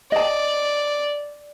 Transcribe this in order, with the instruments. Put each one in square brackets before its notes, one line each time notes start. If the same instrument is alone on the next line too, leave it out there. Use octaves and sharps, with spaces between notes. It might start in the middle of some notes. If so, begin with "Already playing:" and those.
[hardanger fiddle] D5 [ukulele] D#5 A5